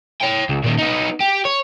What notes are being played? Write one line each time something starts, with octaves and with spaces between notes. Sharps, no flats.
C#5 G5
C#2
A#2 D#3
B3 D#4
G4
C#5